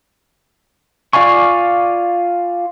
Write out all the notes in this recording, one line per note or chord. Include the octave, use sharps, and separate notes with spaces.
F4 D5 F5 G#5 C#6